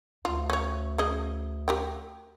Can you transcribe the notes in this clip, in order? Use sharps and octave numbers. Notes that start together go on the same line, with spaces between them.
D2 F4
C#4 C#5
C#3 G#4 D#5
G4 A#4 G5